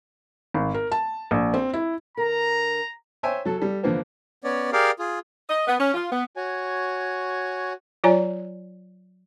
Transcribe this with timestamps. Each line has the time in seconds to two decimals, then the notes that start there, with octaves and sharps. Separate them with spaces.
0.54 G#1
0.74 A#4
0.92 A5
1.31 A#1
1.54 C4
1.73 E4
2.17 D3 A#4 A#5
3.23 C5 C#5 E5 G5 G#5
3.45 F#3 A4
3.58 G3 A4
3.83 E2 D3 F3 A#3 B3
4.44 B3 C#4 C#5 D5
4.73 G4 G#4 A#4 D5 F5
4.99 F4 G#4
5.48 D#5
5.66 B3
5.79 C#4
5.94 F4
6.11 B3
6.36 F#4 C#5 G#5
8.04 F#3 F4 C#5 D5 G#5 A#5